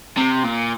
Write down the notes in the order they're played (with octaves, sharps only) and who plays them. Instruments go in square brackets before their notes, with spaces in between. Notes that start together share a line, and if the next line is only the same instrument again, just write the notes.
[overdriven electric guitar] C3
A#2